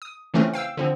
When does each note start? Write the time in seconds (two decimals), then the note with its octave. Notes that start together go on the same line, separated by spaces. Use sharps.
0.02 D#6
0.34 C#3 E3 F3 A3 C4 C#4
0.54 F5 G5 E6
0.77 D3 F3 C4